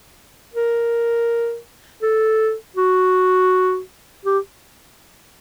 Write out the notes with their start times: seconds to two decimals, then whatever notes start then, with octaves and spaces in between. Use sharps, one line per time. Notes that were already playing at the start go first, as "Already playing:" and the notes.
0.54 A#4
2.02 A4
2.76 F#4
4.25 G4